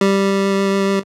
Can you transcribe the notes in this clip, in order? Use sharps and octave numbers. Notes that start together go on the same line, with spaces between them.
G3